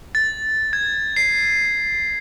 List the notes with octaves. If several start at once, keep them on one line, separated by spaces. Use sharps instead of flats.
A6
G#6
C7